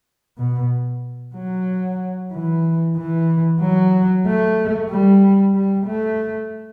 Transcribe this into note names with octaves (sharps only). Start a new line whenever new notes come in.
B2
F#3
E3
E3
F#3
A3
G3
G3
A3